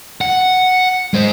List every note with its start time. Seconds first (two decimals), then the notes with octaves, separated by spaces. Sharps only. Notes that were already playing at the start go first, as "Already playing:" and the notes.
0.21 F#5
1.14 G#3 C5